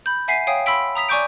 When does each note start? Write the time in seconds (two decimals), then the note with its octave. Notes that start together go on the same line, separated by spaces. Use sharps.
0.06 B5 G6
0.28 E5 F#5 G#5 B6 C7 D#7
0.47 C#5 F5 G5 G#5 D#6
0.66 B5 C6 E6 B6 D7
0.95 A#5 D#6 B6 F7
1.09 D5 G#5 C#6 D6 G6 D7